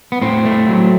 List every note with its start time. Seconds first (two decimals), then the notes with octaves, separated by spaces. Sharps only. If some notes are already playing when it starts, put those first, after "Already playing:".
0.12 B3
0.22 A2 C4
0.45 A3
0.69 F#3